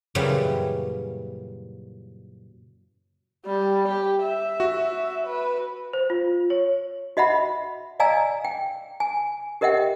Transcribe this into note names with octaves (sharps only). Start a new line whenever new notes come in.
F#2 A#2 C#3 E3 F#3 G3
G3
G4
E5
F#4
B4
C5
F4
C#5
F#4 D#5 E5 F#5 B5
D5 D#5 F5 G#5 A#5 E6
G5
G#5
G4 A#4 D#5 E5 F#5 G5